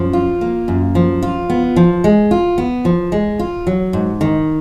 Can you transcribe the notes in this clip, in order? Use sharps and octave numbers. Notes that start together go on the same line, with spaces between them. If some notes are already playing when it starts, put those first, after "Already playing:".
Already playing: F#2 F3
F4
A#3
F#2
F3
F4
B3
F3
G#3
F4
B3
F3
G#3
F4
F#3
G#2
D#3